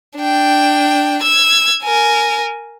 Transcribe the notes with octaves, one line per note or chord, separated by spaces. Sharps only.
D4 G5
E6 G#6
A#4 G#5